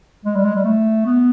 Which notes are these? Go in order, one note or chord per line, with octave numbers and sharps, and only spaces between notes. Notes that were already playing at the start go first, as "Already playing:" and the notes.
G#3
G3
G#3
G3
A3
B3